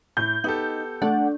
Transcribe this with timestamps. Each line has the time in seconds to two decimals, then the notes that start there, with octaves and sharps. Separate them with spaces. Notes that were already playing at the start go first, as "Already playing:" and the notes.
0.17 A2 G6
0.44 B3 D#4 G4 A4
1.02 A3 D4 F#5